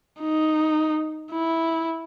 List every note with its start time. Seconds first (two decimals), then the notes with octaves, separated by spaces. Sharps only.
0.21 D#4
1.32 E4